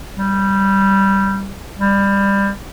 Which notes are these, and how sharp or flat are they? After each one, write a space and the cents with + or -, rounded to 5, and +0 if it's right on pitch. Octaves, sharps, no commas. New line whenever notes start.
G3 -5
G3 +20